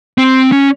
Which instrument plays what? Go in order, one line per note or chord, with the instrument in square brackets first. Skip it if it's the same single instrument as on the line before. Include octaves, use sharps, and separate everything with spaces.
[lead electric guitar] C4
C#4